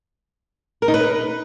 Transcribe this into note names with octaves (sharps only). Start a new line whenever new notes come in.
A#4
D#4
B4